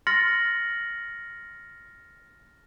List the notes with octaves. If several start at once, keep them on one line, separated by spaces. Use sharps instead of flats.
C6 F6 A6 A#6 C#7 F#7